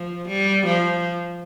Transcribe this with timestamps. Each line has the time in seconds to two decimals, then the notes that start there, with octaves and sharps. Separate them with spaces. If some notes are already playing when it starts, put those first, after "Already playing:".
Already playing: F3
0.28 G3
0.66 F3